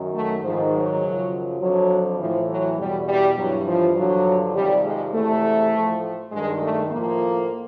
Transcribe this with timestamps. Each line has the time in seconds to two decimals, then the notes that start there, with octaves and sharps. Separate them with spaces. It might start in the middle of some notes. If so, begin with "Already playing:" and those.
Already playing: F#2 D#3
0.14 A3
0.42 G#2 D#3 F3
0.72 F#3
1.02 F#2 C#3 F3
1.61 F2 D3 F3 F#3
2.19 A2 E3 F3
2.49 F#3
2.78 E2 B2 G3
3.08 G3
3.37 G2 E3 F#3
3.67 F3
3.97 G2 D3 F3 F#3
4.55 F2 C3 D#3 G3
4.85 G#3
5.14 E2 C3 E3 A3
5.73 A2 F3
6.32 G2 D#3 G#3
6.61 A3
6.91 A2 F3 A#3